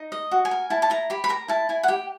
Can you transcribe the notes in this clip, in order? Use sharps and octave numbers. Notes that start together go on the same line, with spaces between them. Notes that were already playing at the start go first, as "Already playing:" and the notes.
Already playing: D#4
D#5
F#4
G#5
A#4
E4 A5
A5
E4 A#5
G4 B5
B5
A#4 A#5
E4 A5
E4 G#5
F#5
G4 G5